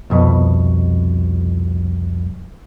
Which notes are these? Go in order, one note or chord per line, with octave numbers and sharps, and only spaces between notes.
C2 F2 B2